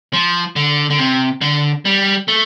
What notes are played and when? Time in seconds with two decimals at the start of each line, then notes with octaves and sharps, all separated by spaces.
0.13 F3
0.56 D3
0.90 D3
0.98 C3
1.41 D3
1.85 G3
2.28 A3